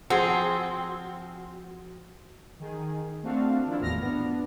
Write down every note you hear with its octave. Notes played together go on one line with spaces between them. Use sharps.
F3 C4 F#4 G#4 F#5
D#3 G#4
A3 C4 D4 F#4 F5
D#3 F3 D4 E4 F4
G#1 E2 A2 B3 F6 A#6
B3 D4